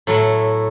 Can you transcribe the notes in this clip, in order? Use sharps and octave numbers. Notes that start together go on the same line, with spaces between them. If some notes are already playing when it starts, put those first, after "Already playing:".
A2 F#3 A3 E4